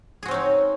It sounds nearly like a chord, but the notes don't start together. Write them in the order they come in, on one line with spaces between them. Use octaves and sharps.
G#4 F#4 C4 C#4 D#4